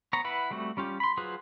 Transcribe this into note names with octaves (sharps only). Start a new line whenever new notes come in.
B3 C#5 A#5
E4 B4 F#5
G3 A3 C4 F#4
G3 C#4 F4 G4
B5 C6
F#3 F4 G#4 B4 C5